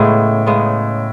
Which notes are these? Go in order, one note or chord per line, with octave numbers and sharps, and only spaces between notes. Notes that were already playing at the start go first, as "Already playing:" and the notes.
Already playing: A2 C#3 G#3 B3
C#3 G#3 B3